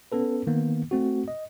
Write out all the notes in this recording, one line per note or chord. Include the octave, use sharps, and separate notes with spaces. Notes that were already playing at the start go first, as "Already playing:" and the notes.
B3 C#4 A4 B4
D#3 A#3 B3
A3 C4 F#4
D#5